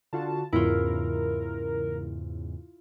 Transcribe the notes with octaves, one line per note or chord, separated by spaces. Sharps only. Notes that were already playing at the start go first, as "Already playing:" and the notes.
D3 F4 F#4 A5
E2 G#2 C#3 E4 F4 A#4